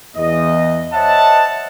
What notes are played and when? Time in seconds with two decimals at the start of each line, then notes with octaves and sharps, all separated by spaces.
0.16 E2 D#5
0.93 C5 C#5 D#5 E5 F#5 A5